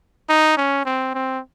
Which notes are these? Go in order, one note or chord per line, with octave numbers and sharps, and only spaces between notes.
D#4
C#4
C4
C4